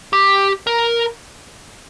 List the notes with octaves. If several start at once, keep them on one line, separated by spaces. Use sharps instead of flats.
G4
A#4